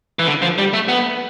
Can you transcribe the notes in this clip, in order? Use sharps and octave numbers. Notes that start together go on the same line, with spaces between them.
E3
D3
F3
G3
A3
B3